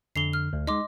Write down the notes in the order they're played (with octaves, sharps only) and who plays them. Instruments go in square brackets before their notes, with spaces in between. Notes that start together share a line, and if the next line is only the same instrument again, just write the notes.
[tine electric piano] F2 D3 [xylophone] C7 F7 G7
[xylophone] F6
[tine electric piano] D2
[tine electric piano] G#3 D#4 [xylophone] D#5 C6 D6